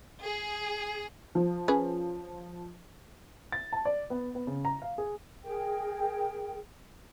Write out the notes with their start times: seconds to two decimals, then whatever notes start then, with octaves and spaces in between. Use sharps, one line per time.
0.23 G#4
1.35 F3
1.68 C#4 G#4 B4
3.52 A6
3.72 A5
3.85 D5
4.10 B3
4.35 B3
4.47 C#3
4.65 A#5
4.82 F5
4.98 G#4
5.44 G#4 A#4 G5